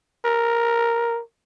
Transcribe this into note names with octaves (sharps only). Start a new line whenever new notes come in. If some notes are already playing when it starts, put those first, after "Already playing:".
A#4